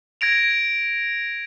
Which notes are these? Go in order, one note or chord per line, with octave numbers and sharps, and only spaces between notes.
G#6 A#6 D7 F7